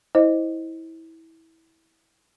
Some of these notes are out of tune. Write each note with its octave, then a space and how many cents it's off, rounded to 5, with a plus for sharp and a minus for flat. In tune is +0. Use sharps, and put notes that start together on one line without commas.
E4 -20 C5 +0 D#5 +0